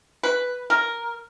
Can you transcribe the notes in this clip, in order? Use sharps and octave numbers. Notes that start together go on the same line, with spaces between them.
B4
A#4